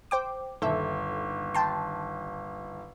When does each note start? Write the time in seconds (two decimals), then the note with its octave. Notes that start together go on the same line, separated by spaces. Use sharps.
0.11 C5 G5 D6
0.62 G1 D#2 A4 E5
1.54 G5 A5 C6